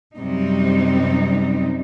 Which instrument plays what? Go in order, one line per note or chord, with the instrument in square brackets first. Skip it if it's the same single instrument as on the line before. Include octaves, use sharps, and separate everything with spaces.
[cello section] F#2 C3 G3 D#4